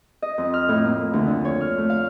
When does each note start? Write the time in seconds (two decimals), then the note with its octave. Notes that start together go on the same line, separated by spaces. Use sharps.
0.22 D#5
0.38 F2
0.54 F6
0.69 A2
0.86 A#3
1.13 D2
1.27 D3
1.45 C#5
1.61 F6
1.78 A3
1.90 F5